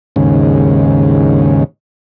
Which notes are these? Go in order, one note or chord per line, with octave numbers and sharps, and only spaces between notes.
D#2 G#2 C#3